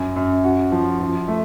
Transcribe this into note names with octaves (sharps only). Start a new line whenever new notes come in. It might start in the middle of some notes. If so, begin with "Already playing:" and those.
Already playing: F#2
F#2
F#4
F3
F3
A3